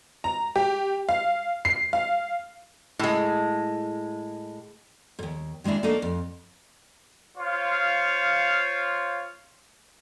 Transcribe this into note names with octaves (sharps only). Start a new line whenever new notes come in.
A#5
G4
F5
C7
F5
A2 G#3
D#2 G#2
D#3 G#3 A#3 D4 E4
A3 A#3 D4 D#4 A4
F2
F4 C5 C#5 F5